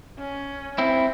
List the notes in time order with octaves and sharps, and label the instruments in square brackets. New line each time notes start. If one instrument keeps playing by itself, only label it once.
[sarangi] C#4
[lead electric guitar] C4 E4